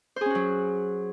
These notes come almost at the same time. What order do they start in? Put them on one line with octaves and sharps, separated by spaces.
C5 G#4 C#4 F#4 F#3